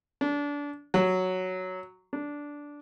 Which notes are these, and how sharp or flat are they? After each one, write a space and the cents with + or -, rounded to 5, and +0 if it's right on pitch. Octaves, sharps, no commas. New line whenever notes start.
D4 -25
F#3 +0
D4 -10